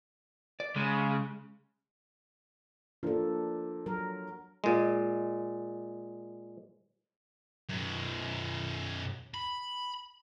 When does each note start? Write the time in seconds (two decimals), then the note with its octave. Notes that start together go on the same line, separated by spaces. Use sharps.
0.60 D5
0.76 C#3 G#3
3.03 F3 A#3 D4 A4
3.86 F#3 A#4
4.64 A#2 G#3
7.69 F#2 B2
9.34 B5